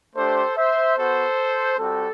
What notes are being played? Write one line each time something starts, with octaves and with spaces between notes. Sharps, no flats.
A3 D4 G4 A4 C5
C5 E5
B3 F#4 A4 C5
G3 C4 F#4 A4